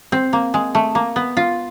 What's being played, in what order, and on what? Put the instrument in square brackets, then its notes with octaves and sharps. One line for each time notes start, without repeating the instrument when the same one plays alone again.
[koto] C4
A#3
G#3
A3
A#3
B3
F4